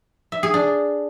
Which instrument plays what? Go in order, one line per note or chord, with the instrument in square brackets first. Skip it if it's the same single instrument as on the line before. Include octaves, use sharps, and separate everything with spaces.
[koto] E5
G#4
D4